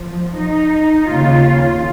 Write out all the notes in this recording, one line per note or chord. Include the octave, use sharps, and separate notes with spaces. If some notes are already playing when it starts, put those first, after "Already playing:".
Already playing: F3
D#4
D#2 C#3 F4